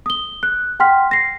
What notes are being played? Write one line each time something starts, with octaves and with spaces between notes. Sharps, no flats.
D#6 G7
F#6
F#5 G5 C6 F6 B6
A#6 C7